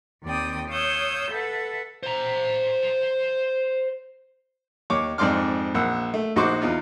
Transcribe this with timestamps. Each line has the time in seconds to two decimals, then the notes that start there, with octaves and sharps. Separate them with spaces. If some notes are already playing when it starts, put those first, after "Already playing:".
0.24 D#2 C4 D5 G5 D#6
0.68 C#5 F5 D#6 E6 G6
1.30 A4 B4 E5 F#5
2.03 C5 A#5
4.90 D#2 C#5 D6
5.18 F2 G#2 D5 C6 D6 F6
5.74 A#1 F#5 E6
6.14 A3
6.36 A#1 D#4 F#4 C5 C#6 D6
6.62 E2 D#4 F4